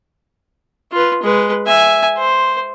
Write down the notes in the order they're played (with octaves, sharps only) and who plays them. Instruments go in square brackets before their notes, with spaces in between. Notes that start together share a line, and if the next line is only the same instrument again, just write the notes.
[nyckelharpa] F4 B4
G#3 B4
E5 G#5
C5